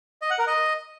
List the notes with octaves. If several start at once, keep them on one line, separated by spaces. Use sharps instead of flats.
D#5
F#5
A#4
D#5